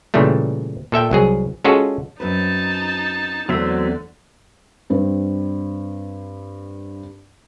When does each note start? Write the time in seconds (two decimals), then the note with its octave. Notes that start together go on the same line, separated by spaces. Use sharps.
0.14 A#2 C#3 E3 G3 A3
0.92 A#2 A4 E5 G5
1.11 C2 F#3 G#4
1.64 G#3 C#4 F4 F#4 G#4 A4
2.20 F#2 C4 D#4 B4 A5
3.49 E2 D3 F#3 A3 C4 E5
4.90 G2 C4